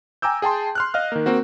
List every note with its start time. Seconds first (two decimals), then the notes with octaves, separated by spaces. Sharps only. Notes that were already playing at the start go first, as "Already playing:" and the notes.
0.22 G5 G#5 A#5 D6 E6 G6
0.42 G#4 G5 A5 C6
0.75 C6 F6 F#6
0.94 D#5 F5 F6
1.12 D#3 A#3
1.26 A#3 C4 F#4